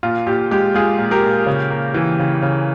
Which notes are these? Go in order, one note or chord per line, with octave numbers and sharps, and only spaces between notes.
A#2 F4
A#2 G4
G#3 G4
G#3 F4 G#4
A#2
G4 A#4
A#2
C#3
A#3
E3
C#3
C#3